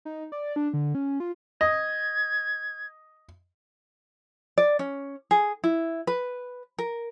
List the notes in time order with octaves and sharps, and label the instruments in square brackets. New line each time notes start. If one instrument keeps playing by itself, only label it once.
[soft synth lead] D#4
D5
D4
D3
C#4
F4
[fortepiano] D#5 [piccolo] G#6
[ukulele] D5
C#4
G#4
E4
B4
A#4